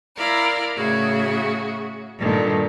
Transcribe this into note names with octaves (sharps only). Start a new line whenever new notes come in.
E4 A#4 D5 F5
A2 C#3 F#4 E5
G2 A#2 D3 D#3